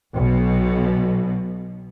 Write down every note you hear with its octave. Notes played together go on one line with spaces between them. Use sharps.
B1 B2